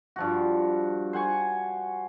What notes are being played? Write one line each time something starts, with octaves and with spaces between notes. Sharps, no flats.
G2 F3 F#4
C5 F#5 G#5 C#6